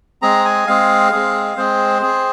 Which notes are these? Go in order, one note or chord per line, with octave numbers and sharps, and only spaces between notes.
G#3 C4 G#4 A#5
G#5
G#3 C4 G#4 F5
G#3 C4 G#4
G#3 C4 G#4 C5
C4 G#4